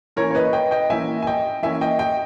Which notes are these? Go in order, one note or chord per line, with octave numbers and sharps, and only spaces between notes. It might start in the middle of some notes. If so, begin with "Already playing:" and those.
E3 A#3 C#4 A#4 C#5
C#5
B4 D#5
D#5 G5
D#5 G5
E3 A#3 C#4 E5 G#5
G#5
D#5 G5
E3 A#3 C#4 E5 G#5
D#5 G5
D#5 G5